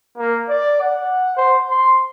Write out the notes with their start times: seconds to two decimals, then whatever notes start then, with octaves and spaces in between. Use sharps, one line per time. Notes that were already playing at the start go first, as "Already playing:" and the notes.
0.18 A#3
0.49 D5
0.82 F#5
1.37 C5
1.71 C6